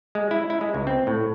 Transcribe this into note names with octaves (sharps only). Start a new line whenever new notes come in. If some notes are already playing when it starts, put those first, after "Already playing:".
G#3
E4
E4
G#3
C#2
C4
A2